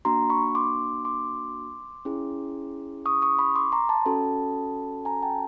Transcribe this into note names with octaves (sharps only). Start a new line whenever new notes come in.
A#3 D4 F#4 A#5 C6
B5 C#6
C6 D6
C6 D6
C#4 E4 G#4
C#6 D#6
C#6 D#6
B5 C#6
C6 D6
A#5 C6
A5 B5
C#4 F#4 A4
G#5 A#5
G5 A5